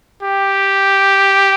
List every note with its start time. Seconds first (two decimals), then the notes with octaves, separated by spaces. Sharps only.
0.22 G4